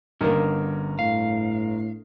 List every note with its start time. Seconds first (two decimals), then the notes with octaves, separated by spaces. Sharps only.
0.21 G1 D3 D#3 G3 A#3 C#4 A#4
0.99 A2 F5